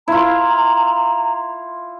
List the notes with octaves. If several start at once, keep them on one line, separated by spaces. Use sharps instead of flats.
E4 F4 A#5